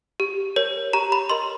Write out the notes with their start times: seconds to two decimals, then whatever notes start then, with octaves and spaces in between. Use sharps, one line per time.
0.20 G4
0.56 A#4 C#5
0.93 G4 A#5
1.12 B5
1.30 A#4 D#5 C6